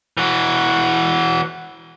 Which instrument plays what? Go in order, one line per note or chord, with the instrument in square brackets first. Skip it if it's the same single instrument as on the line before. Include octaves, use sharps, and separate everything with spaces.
[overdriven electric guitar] E3 F#4